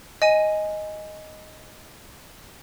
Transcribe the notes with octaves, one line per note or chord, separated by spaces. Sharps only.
D#5 G#5 D#7